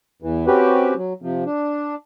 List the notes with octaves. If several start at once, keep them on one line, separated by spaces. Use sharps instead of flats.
E2 E3
C4 C#4 F#4 G4 B4
F#3
C3 F3
D4